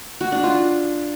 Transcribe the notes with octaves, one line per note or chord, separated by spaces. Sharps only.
F#4
D4
F4